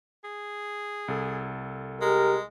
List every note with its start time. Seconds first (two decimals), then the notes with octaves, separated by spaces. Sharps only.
0.24 G#4
1.08 C2 A4
2.01 G#3 G4 A#4